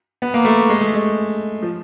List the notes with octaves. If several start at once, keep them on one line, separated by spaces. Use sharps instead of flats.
B3
A#3
A3
G#3
A3
G#3
F3